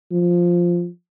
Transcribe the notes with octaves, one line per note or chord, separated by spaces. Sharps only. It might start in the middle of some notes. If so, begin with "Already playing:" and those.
F3